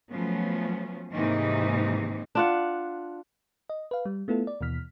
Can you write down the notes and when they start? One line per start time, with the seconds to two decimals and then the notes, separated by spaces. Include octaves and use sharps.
0.12 F3 F#3 A3 B3 C#4
1.14 G#2 C3 D#3 E3 A#3 D#4
2.35 D4 F4 F#5
3.70 D#5
3.91 B4 F5
4.05 G3
4.28 A3 B3 E4 F4 A4
4.47 D5
4.61 D#2 B2 E3 F6 B6